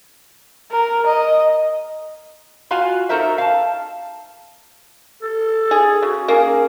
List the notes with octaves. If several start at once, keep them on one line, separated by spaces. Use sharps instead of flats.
A#4
D#5
F4 F#4 F5 G#5
D#4 F#4 A4 A#4 C5 E5
F5 A5
A4
G#4
C#3 F#4
A#3 C#4 G#4